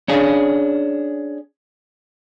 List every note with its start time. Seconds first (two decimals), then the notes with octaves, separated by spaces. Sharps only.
0.08 C#4 D4 G#4